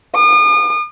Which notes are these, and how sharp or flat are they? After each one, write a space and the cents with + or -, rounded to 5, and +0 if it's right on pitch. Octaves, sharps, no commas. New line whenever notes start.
D#6 -40